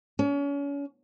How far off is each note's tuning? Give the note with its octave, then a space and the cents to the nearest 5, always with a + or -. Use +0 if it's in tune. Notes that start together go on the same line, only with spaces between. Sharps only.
C#4 +35